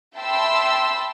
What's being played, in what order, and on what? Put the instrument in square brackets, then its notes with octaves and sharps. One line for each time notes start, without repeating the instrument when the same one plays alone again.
[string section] E5 G5 A5 B5 C6 E6